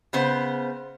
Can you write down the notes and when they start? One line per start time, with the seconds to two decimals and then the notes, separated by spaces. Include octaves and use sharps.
0.13 C#3 B3 C5